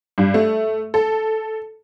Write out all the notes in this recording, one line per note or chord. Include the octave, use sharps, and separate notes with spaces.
G2
A3
A4